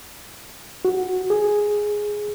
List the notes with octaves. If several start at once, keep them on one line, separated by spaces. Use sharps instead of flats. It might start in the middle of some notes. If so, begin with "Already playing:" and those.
F#4
G#4